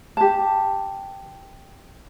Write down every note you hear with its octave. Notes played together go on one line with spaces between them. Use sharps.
G4 A5